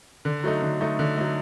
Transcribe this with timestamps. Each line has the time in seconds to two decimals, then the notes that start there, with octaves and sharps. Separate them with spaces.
0.25 D3
0.44 F#3 A3 D#4
0.62 D3
0.81 F#3 A3 D#4
0.99 D3
1.17 F#3 A3 D#4